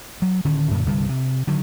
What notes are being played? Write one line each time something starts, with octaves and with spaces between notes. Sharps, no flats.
F#3
D1 D3 D#3 C#4
F#2 A#2 D3
C2 G2 D3 G3
C3
D3 D#3 F#3